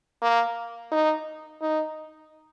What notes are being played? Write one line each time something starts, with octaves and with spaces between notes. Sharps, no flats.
A#3
D#4
D#4